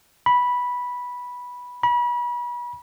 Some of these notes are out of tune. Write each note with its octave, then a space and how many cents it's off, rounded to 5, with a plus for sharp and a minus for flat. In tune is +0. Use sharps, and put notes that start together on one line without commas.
B5 -10
B5 -35